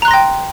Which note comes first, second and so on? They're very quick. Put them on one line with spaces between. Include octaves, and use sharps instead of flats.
A#5 F#6 C6 A#6 G5